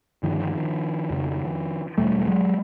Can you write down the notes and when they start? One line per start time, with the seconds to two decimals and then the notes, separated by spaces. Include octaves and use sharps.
0.23 G2 D3 D#3 F3
1.10 F2 C#3
1.98 E2 B2 G3 A3
2.20 A3
2.27 F#3 G#3